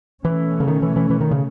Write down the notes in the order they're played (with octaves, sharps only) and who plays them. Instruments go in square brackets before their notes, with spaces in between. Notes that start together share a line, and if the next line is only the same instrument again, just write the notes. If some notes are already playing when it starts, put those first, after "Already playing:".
[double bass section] B2 A3 C#4 [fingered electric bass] E3
[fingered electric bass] C#3
D#3
E3
E3
E3
D#3
C#3